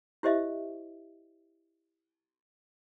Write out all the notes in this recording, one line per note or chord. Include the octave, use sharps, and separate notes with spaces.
E4 G4 C5 D#5 E5